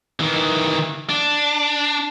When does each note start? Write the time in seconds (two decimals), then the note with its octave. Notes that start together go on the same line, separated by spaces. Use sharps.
0.20 D#3 E3
1.09 D4